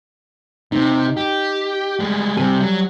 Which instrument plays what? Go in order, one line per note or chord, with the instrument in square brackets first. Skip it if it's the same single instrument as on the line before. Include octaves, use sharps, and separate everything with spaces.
[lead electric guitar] C3 [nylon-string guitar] D#4
[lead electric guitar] G4
G3 G#3
[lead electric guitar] C3 [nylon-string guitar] G3 G#5
[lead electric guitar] F#3